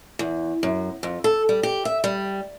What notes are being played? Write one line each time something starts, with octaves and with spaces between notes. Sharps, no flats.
E2
F#2
F2
A4
G3
G4
E5
G3